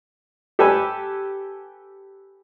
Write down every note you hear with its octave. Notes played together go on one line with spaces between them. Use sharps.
G4 A4 B4 G#5